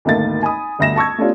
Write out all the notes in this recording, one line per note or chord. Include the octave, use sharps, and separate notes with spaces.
G#1 D2 A3 A#3 E5 A6
G#5 B5 D#6
G1 D2 E5 A#6 E7
A5 C#6 E6 G#6
A3 B3 C#4 D4 F4 G4